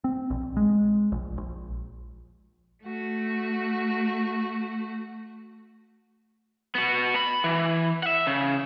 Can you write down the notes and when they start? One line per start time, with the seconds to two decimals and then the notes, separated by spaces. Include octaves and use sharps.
0.04 C4
0.30 A#1
0.57 G#3
1.12 A#1
1.38 A#1
2.84 A3 F#4
6.75 B3 F#4
7.16 B5
7.44 E3
8.03 E5 F#5
8.27 C#3